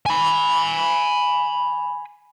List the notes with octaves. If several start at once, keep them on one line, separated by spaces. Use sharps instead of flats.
G#5 B5